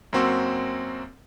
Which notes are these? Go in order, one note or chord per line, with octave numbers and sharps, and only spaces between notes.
F#2 A#3 C4 F#4 C6 E6